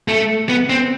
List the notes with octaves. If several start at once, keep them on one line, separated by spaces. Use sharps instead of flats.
A3
B3
C4